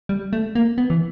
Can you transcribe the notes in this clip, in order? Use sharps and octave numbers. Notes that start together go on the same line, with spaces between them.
G3
A3
A#3
B3
E3